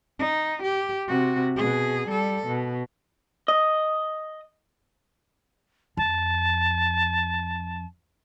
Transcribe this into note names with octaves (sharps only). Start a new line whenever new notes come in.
D#4
G4
C3 F#4
B2 G#4
G3 A4
B2
D#5
F2 A5